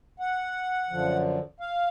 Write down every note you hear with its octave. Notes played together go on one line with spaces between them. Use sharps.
F#5
F#2 D3 F3
F5